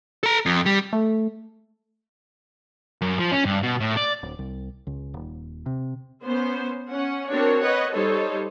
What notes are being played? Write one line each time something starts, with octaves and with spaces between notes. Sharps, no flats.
A4 A#5
F2
G3
A3
F#2
F3
C#4
G2
B2
A2
D5
D1
C2
C#2
D#1
C3
B3 C#4 C5
C#4 F#5
C4 D4 F#4 A#4 C#5
B4 C#5 D#5 F#5
G3 D#4 A4 C5 C#5